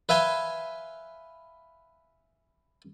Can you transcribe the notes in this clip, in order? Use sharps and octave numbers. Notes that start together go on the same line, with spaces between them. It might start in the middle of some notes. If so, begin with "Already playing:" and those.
B4 E5 F5 G#5 C6